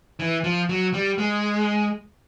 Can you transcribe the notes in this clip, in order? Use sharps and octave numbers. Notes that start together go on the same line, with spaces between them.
E3
F3
F#3
G3
G#3